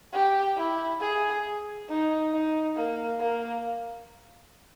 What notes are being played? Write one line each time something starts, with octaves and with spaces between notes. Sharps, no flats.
G4
E4
G#4
D#4
D#4
A#3
A#3